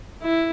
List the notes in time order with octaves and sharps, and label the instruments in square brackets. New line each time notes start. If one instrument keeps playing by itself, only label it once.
[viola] E4